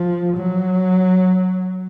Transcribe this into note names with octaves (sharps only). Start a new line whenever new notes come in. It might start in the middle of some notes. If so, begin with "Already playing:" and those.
Already playing: F3
F#3